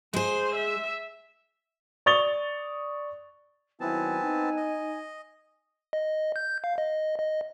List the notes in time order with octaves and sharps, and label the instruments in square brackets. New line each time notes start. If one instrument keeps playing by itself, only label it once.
[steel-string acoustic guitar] G#3 G#4 [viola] C5
[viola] E5
[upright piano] D5 C#6 D#6 A6 F7 G7
[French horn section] D#3 F#3 E4 [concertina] B3 C4 A5 [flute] G#5
[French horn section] D#4
[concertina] D#5
[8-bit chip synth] D#5
G6
F5
D#5
D#5